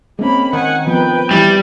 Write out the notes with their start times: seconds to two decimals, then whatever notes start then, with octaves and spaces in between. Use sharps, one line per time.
0.19 G#3 A#3 C4 C#4 B5
0.53 D#3 F#5 G#5
0.87 F3 B3 C4 B4 G5
1.31 E3 G3